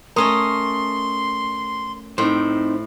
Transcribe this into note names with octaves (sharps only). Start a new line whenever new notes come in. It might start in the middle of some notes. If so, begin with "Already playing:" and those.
A3 C#4 A#4 D#5 C6 D#6
A2 C4 D#4 C5